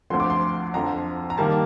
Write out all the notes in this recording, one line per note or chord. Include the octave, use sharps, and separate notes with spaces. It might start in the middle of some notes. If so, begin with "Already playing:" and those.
D2 D3 F3 C4 C6
D6
C6
F2 D3 F3 A#5
A#5
D#3 G3 A#3 A5